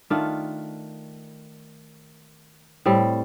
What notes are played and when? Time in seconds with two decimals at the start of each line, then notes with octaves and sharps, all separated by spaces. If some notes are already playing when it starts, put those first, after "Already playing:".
0.10 D#3 A3 D4 F4
2.86 A2 G3 C4